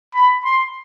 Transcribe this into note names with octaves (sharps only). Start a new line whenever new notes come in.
B5
C6